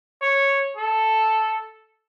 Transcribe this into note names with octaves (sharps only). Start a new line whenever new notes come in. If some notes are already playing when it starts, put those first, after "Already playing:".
C#5
A4